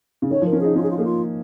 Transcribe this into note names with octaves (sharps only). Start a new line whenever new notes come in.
C#3
D#3 C#5
F3
A#4
C#4
D#4 G#4
C#4 F4
G#4
F4
A#3 G#4
F4